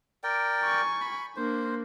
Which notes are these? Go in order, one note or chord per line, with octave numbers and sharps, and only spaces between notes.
A#4 D5 G5
G#5 C#6
B5
A#3 D4 C5